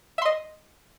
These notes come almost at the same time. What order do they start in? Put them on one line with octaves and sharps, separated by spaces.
E5 C6 D#5